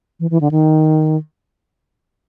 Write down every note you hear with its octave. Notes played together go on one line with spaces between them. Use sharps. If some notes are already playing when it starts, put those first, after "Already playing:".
E3
E3
D3
D#3